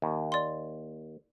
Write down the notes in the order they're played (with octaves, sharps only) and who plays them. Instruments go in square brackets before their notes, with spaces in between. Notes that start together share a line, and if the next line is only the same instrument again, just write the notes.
[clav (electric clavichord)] D#2
[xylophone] D5 C6